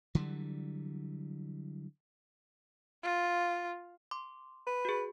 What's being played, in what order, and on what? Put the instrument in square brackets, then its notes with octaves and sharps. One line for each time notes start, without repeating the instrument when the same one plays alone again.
[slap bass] D3 E3 F#3 G3
[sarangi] F4
[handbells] C6 D6
[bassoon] B4
[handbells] F#4 G#4